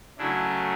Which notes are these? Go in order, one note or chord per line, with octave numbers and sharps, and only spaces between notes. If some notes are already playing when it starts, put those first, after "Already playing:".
C#3 F#3 A3 D4 E4